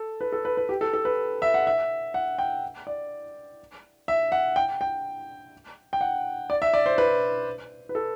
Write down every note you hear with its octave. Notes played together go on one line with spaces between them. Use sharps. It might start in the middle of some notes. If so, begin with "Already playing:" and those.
Already playing: A4
B4
A4
B4
B4
G4
A4
A4
B4
E5
F#5
E5
F#5
G5
D5
E5
F#5
G5
G5
G5
F#5
D5
E5
D5
C5
B4
B4
A4